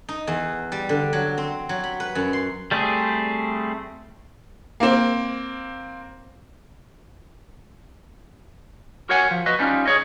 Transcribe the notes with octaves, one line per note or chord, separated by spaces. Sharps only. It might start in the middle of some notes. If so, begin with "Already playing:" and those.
D#4
E2
G3
D3
F#3
C4
F#3
B5
B4
F#2
C6
G3 A3 C4 G#4
A#3 C4
F#4 A#4 C#5 F#5 G#5
F3
F#4 B4 D#5
G3 C#4 D#4 F4
G#4 C#5 D#5